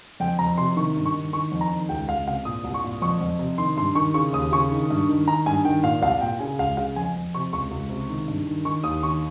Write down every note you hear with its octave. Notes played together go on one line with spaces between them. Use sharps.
F2 G5
F2 A#5
C3 C6
D#3 C#6
G2
C#6
D#3
D#3 C#6
F2
A#5
D#3
C#2 G5
C#2 F5
C3 F5
A#2 D#6
C2
C#6
A#2
F2 C#6
F2
C3
D#3 C6
G2 C6
D#3 C#6
C#3 C#6
D#2 D#6
C#3 C#6
D#3
G2
D#3
D#3 A#5
G2 G#5
D#3 G5
A#2 F5
C2 F5
A#2 G5
C#3 G#5
C#2 F5
C#3 F5
F2 G#5
F2
C3 C#6
C#2 C#6
C#2
C3
D#3
G2
D#3
D#3 C#6
D#2 D#6
D#3 C#6